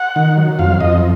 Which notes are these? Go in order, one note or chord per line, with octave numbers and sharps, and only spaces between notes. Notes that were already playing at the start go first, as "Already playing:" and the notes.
Already playing: F#5
D#3
F#3
F2 F5
F2 D#5